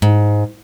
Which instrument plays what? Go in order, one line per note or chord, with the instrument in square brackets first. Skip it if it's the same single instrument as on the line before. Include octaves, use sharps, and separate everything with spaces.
[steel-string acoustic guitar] G#2